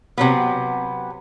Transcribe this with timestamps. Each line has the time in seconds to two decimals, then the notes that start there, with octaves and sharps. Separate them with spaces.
0.18 C3 F#3 B3